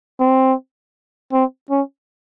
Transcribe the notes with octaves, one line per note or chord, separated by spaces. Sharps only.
C4
C4
C#4